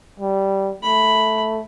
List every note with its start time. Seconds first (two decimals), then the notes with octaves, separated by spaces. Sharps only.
0.20 G3
0.83 A3 B5